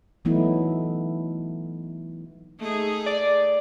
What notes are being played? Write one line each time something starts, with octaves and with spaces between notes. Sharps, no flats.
E3 F#3 A3 B3 D#4 E4
A3 D#4 G#4
D5